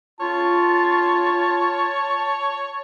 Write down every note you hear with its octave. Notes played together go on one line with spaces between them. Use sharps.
F4 C#5 A5